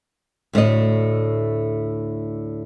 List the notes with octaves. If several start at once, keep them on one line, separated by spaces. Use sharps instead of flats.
D2 A2 A3 D#5